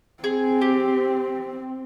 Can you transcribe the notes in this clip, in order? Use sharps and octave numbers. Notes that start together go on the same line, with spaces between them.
C4 G#4
G4